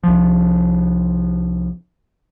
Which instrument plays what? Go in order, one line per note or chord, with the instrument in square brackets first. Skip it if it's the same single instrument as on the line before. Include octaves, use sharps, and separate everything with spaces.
[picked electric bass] C2 F3